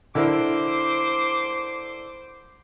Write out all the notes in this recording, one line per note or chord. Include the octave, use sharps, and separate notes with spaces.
D3 E4 A#4 C5 D6